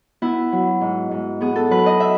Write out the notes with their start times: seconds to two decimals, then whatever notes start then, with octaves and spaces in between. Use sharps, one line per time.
0.22 B3 E4
0.52 F#3
0.81 G#2
1.11 G#2
1.41 B3 G#4
1.56 A4
1.70 F#3 B4
1.86 D#5
2.00 E5